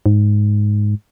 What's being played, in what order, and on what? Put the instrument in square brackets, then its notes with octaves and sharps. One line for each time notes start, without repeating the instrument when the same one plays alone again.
[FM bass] G#2